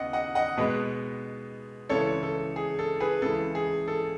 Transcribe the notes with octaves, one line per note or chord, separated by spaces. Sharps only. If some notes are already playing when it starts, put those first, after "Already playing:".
Already playing: D#2 C#3 B3 D#5 F#5
D#5 F#5
D#5 F#5
B2 G#3 B3 B4 D#5
C#2 C#3 E3 A4 C#5
A4
G#4
A4
G#4 B4
C#2 C#3 E3 A4
G#4
A4